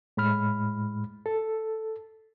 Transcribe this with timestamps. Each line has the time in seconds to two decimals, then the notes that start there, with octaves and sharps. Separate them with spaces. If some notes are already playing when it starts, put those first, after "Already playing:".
0.17 A2 G#3 B5 F6
1.26 A4